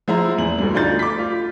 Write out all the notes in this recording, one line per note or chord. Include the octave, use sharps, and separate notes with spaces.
F3 G#3 E4 A#5
E2 F#7
D2 G2
D2 D4 D#4 F4 G6 A6
D6 B6
F4